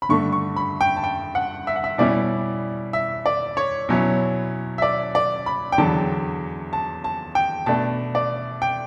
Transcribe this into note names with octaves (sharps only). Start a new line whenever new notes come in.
B5
G2 D3 A3 C#6
C#6
B5
G5
A5
G5
F#5
E5
F#5
E5
B2 G3 C#4 E4 D5
E5
D5
C#5
B2 F#3 C#4 E4
E5
D5
D5
B5
G5
E2 D3 F#3 A5
A5
A5
G5
B2 A3 D4 A5
D5
G5